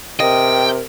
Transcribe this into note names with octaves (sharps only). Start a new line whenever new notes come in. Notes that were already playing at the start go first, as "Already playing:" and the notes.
C3 A#4 D#5 G5